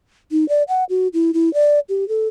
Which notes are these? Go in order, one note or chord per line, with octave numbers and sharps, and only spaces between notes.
D#4
D5
F#5
F#4
E4
E4
D5
G4
A4